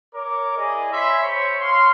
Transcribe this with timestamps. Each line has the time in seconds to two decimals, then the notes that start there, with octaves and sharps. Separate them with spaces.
0.14 A#4 C#5 D6
0.57 E4 G#4 D5 D#5
0.91 C#5 E5 G#5 B5 C6
1.22 C5 C#5 B5 C#6
1.60 C#5 F5 C6